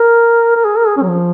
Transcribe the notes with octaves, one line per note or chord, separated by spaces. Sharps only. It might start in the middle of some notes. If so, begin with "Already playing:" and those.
Already playing: A#4
A#4
G#4
A#4
G#4
C#4
F#3
F3